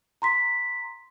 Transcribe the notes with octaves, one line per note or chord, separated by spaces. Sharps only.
A#5 C6 B6